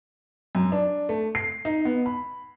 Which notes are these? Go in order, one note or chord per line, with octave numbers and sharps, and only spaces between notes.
F#2
D4
A3
C7
D#4
B3
B5